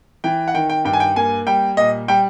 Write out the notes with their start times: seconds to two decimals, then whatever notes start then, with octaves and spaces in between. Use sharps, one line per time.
0.24 E3 G5
0.48 F#5
0.54 D#3 G5
0.70 G5
0.85 G2 G5
0.93 G#5
1.00 G5
1.16 A#3 G#5
1.47 G3 G5
1.77 A#2 D#5
2.08 G3 G5